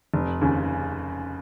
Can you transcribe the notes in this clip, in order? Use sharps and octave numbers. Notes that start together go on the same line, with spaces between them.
F1
D#2 C#3